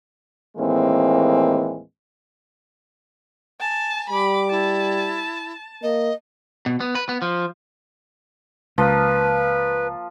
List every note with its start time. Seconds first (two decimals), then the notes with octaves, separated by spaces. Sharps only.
0.57 D#2 A2 E3 G#3 A#3 C4
3.60 G#5 A5
4.10 G3 B5 D6
4.51 E4 A5
5.83 A#3 D#5
6.66 B2
6.80 B3
6.95 B4
7.09 B3
7.22 F3
8.78 C#2 F3 A#3 B4